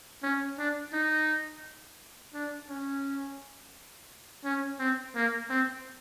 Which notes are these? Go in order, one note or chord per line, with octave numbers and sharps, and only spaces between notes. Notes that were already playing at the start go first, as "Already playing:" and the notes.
C#4
D4
D#4
D4
C#4
C#4
C4
A#3
C4